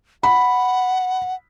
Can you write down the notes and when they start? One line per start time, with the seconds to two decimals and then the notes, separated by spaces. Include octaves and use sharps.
0.23 F#5 B5